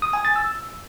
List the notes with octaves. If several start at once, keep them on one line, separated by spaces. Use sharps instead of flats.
D#6
G#5
A6
E6